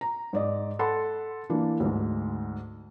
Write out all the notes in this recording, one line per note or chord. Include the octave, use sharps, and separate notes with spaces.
A#5
G#2 D5 D#5
A4 F#5 B5 C6
E3 A#3 D4
D2 G#2